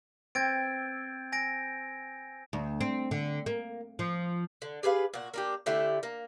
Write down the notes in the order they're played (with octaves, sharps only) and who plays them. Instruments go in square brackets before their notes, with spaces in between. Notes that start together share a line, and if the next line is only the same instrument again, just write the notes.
[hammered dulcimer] C4 [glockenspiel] G#6 A6 D7
[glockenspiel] G#5 A#6 D7
[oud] D2
C4
D3
A#3
F3
[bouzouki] D3
G4 G#4 B4 F5
A#2 F#4
A#3 D4 G4
D3 A3 E4 G4
A#3